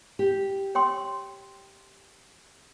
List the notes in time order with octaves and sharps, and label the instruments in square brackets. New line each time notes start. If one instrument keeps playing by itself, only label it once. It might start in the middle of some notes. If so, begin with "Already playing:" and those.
[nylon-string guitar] G4
[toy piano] C#5 G5 C6